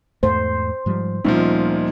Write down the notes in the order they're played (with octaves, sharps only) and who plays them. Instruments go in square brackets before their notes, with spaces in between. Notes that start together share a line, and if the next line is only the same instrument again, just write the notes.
[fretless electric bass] E2 G#2 A3 [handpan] C5
[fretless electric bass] G#2 F3 G3
[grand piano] D2 A#2 F3 [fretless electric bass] G3 B3 C#4 [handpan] D#4